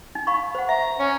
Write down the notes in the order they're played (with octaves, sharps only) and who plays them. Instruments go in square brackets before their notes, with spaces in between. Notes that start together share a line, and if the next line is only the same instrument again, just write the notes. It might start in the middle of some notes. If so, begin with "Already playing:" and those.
[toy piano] D#4
F5 B5 C#6
C5 F#5
[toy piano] E5 [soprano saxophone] A#5
[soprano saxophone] C#4